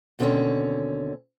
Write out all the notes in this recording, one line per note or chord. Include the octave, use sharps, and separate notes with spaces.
D#2 B2 D3 A#3 C4 C#4